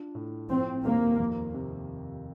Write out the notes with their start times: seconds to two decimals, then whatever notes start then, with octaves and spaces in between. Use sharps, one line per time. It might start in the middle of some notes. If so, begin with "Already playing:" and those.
Already playing: D4 F4
0.15 A2
0.50 F3 C4
0.84 D#2 A#3
1.20 F2
1.54 C3